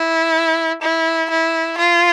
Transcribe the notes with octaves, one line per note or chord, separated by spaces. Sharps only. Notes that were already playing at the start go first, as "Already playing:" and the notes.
Already playing: E4
E4
E4
F4